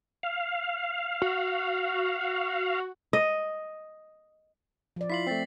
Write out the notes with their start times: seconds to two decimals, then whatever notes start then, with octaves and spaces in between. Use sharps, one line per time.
0.23 F5
1.22 F#4
3.13 D#5
4.96 F3 D5
5.10 E4 F4 B6 C7 F#7
5.27 A3 C4 A6 B6 C7